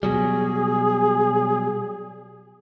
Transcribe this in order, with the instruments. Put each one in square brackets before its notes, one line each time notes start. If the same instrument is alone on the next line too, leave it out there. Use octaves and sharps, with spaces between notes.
[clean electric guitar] B2 F#3 G3 [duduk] G#4